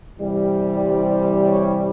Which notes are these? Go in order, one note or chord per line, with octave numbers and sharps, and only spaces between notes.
C3 E3 G3
C5
C#5